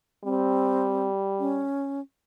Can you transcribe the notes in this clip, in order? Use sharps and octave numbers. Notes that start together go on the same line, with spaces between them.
G3 C4
C#4